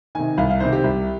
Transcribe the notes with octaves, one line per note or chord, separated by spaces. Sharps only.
C3 D#3 G#5
C2 F5
F5
C3 D#3 C5
G4
C2